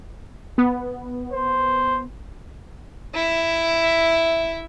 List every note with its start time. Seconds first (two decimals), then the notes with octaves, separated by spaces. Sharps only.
0.58 B3
1.32 C5
3.14 E4 E5